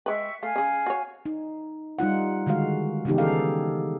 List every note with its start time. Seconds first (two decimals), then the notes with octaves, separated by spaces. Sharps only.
0.06 G#3 B4 E5 G5 C#6
0.43 A3 F5 G#5
0.56 C#3 G#4
0.86 F#4 C#5
1.26 D#4
1.99 G3 D#4 F4 F#5
2.46 D3 D#3 G#3 F#4 F5
3.05 C#3 E3 B3 D#4 G4
3.18 D#3 G#4 A4 F5